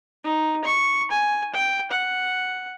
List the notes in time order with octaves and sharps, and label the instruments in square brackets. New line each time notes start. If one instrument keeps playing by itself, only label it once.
[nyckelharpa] D#4
C#6
G#5
G5
F#5